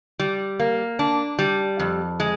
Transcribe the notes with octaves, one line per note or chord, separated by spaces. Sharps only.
G3
A#3
D4
G3
F2
G#3